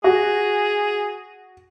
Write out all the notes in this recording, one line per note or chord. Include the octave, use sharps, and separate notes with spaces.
F#4 G#4